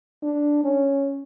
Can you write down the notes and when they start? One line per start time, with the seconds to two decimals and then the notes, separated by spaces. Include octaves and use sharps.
0.22 D4
0.64 C#4